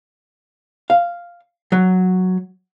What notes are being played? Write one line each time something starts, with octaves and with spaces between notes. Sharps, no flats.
F5
F#3